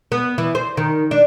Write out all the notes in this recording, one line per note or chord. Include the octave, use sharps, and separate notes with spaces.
B3
E3
C5
D#3
D4